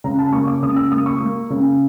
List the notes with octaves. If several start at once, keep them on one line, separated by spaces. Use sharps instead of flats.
C#3 A#5
A5
A#3 C#6
D6
C#3 D#6
E6
A#3 D#6
C#6
A#3
C#3